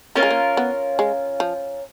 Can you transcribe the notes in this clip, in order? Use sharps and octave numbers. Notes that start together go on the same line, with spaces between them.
A#3 C#4 F4 A#4
G#3
A#3
B3
G#3
F3